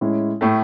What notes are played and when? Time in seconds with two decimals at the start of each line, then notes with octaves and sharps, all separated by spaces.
0.01 A2 G#3 C#4 E4
0.41 A2 A3